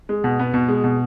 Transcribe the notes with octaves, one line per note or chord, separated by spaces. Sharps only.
G#3
B2
B3
B2
G#3
B2